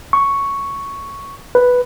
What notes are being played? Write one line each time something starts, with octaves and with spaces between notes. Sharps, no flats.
C#6
B4